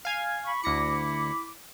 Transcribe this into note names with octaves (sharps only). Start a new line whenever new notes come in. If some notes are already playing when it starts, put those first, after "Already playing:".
F5 G#5 G#6
B5 C#6
D2 E4 B5 D6 A#6 C#7